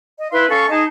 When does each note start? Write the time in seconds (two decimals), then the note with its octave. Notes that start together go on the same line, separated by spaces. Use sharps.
0.19 D#5
0.32 E4 B4 F5 C6
0.49 C#4 A4 F5 C#6
0.70 D#4 G#4 D#5 A5